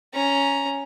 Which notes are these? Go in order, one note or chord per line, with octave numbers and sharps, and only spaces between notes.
C#4 A#5